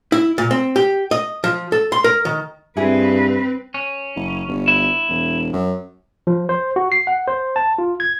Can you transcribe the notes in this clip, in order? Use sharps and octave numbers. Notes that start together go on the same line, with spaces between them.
E4
A#2
C4
G4
D#5
F3
A4
C6
A#4
D#3
G2 C4 E4 G#4 B4
C#4
F#1
G1
E4
E1
F#2
F3
C5
F#4
C7
F#5
C5
A5
F4
G#6